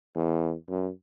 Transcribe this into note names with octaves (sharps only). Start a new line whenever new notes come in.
E2
F#2